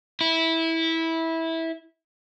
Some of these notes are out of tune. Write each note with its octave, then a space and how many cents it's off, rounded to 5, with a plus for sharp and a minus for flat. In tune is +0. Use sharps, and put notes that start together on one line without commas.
E4 -15